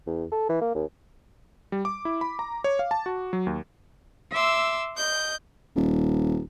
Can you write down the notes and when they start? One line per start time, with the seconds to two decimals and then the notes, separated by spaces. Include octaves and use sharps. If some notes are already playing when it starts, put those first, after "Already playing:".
0.07 E2
0.31 A4
0.49 E3
0.61 A#3
0.75 D#2
1.72 G3
1.85 D6
2.05 E4
2.21 B5
2.39 A#5
2.64 C#5
2.79 F5
2.91 A5
3.06 F#4
3.33 F#3
3.47 D#2
4.32 E5 C6 D6 E6
4.95 D#5 G6
5.76 D#1